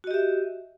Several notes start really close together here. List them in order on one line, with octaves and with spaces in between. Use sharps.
F#4 D#5 G4 E5